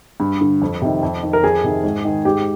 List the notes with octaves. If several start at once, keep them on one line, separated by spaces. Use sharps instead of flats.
G2
D3
F2
C3 D#3
F2
D#3
A#4
F2 G#4
C3 D#3
G#2
D#3
G#2 G4